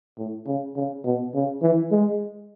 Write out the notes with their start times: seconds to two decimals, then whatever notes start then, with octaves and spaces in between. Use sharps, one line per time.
0.18 A2
0.47 C#3
0.75 C#3
1.04 B2
1.34 C#3
1.62 E3
1.91 G#3